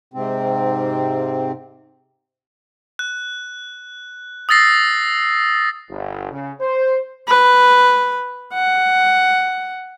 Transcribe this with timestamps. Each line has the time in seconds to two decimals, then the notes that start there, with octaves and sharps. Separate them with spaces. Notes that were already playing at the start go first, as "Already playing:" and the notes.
0.14 G#2 C3 C4
2.99 F#6
4.49 D#6 E6 A6 A#6 C7
5.89 G1
6.32 C#3
6.60 C5
7.28 B4
8.53 F#5